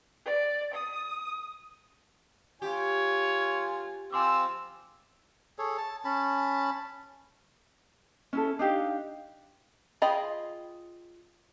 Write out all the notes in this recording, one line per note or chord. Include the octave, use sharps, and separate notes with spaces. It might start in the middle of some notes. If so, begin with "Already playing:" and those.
D5
D#6
F4 G4 C#5 G#5
F3 C4 F4 G#5 C6 D6 E6
G#4 A4 C#5
A5
C#4 A5 B5
C#4 E4 A4
D4 D#4 G4 F5
F4 G#4 D#5 G5 B5